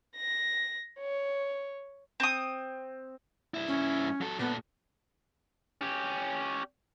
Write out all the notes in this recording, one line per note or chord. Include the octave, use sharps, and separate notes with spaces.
A#6
C#5
C4 D#6
G2 E4
C#4
F#3 A4
A#2 B3 A4
C#4 G4